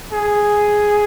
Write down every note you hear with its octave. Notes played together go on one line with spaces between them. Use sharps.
G#4